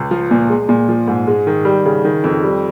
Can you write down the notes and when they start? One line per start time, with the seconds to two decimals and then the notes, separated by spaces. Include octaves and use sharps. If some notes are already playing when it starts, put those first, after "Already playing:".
Already playing: C#2
0.11 F3
0.31 A#2
0.49 G#3
0.69 A#2
0.88 F3
1.08 G#2
1.27 G#3
1.47 D#3
1.65 G3
1.85 C#3
2.05 D#3
2.24 F2
2.43 G3